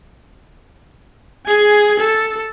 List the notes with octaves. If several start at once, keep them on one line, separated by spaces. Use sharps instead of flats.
G#4 G#5
A4